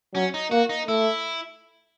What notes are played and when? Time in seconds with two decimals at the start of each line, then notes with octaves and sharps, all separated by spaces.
0.15 F#3 C#4
0.34 D#4
0.51 A#3 F#4
0.69 D#4
0.88 A3 E4